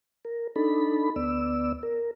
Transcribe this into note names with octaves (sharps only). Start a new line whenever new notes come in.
A#4
D4 D#4 A4 B5
D2 B3 D5 E6
A#4